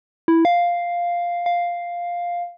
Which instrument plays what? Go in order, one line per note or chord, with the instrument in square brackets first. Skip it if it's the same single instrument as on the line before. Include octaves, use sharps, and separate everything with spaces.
[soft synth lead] E4
F5
F5